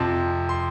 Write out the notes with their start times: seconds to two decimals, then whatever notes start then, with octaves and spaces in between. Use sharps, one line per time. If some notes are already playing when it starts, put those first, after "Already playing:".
Already playing: F2 C3 F3 A5
0.49 C6